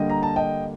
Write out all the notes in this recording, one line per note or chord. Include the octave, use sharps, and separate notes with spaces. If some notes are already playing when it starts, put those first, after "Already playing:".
Already playing: D3 G3 A#3 D4 D#5 G5
A#5
A5
D#5 G5